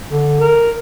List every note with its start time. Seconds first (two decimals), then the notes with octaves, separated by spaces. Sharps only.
0.11 D3
0.40 A#4